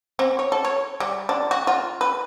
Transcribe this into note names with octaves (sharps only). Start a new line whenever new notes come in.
C4
C#5
A4
C#5
G3
D4
F#4
F4
B4